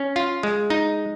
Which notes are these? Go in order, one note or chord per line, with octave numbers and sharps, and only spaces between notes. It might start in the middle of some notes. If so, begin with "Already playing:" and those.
Already playing: C#4
F4
G#3
D#4